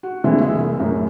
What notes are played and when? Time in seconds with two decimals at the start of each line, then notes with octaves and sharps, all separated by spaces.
0.03 F#4
0.24 F1 D3 E3 G#3 C4 E4
0.41 G#4 E5
0.55 C2
0.80 F#2 A2